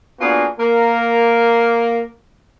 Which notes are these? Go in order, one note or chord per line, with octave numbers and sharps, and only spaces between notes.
A#3 B3 D4 F4 F#4 G#4
A#3 A#4